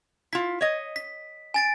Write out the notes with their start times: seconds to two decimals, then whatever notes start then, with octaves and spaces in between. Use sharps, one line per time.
0.33 E4 F4 B6
0.61 C#5 D#5
0.96 B6
1.54 G#5 A6 D7